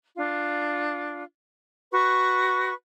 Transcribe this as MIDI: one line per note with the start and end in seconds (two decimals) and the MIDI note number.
0.17 1.24 62
0.17 1.24 65
1.93 2.72 66
1.93 2.72 71
1.93 2.72 85